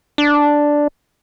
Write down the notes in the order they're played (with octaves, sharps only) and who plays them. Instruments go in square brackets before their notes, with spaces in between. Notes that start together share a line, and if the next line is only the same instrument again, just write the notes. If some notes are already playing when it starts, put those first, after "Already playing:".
[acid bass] D4